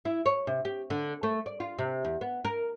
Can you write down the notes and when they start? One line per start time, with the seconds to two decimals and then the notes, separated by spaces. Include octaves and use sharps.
0.05 E4
0.26 C#5
0.47 C3
0.65 G4
0.90 D3
1.23 A3
1.46 D5
1.60 F4
1.79 C3
2.05 E2
2.21 B3
2.45 A#4